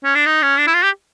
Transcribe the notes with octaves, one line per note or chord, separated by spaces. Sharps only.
C#4
D4
D#4
C#4
D4
E4
F4
G4